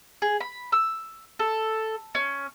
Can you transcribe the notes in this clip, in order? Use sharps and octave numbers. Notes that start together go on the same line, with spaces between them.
G#4
B5
E6
A4
C#4